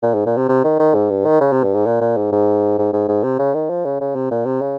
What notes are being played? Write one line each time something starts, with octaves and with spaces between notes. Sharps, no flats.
A#2
G#2
A#2
C3
C3
D#3
D#3
G#2
G2
D#3
C#3
C3
G2
G#2
A#2
A#2
G#2
G#2
G#2
G#2
G#2
C3
C#3
D#3
F3
C#3
C#3
C3
A#2
C3
C#3